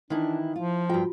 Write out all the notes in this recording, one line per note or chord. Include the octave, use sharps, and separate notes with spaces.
D#3 E3 D4 E4
F3 F4
G2 F4 F#4 G5